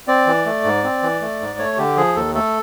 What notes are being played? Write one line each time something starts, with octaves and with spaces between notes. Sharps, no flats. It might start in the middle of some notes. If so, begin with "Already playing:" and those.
C4 D5
E3
A3
G#2
C4
E3
A3
G#2
A3 C#5
D3 G4
F3 G#4
D#2 A4
A3 A4